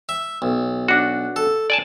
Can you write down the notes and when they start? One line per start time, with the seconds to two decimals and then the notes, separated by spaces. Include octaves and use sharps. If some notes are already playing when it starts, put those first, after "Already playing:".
0.09 E5
0.42 B1
0.88 D4 F#4
1.36 A4
1.70 D5 G#5 A5